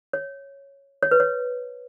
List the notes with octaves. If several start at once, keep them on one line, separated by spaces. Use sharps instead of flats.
C#5
C#5
B4
C#5